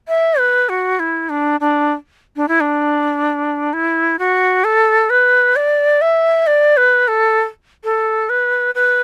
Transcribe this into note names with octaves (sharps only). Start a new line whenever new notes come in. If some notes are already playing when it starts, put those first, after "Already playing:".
E5
B4
F#4
E4
D4
D4
D4
E4
D4
E4
F#4
A4
B4
D5
E5
D5
B4
A4
A4
B4
B4